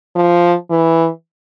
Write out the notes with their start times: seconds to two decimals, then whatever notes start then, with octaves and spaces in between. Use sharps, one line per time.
0.16 F3
0.70 E3